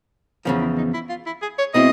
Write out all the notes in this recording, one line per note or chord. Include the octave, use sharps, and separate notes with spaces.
E2 C#3 F3 B3
E4
D#4
E4
F4
E4
G#4
C#5
B2 G#3 C4 E4 D#5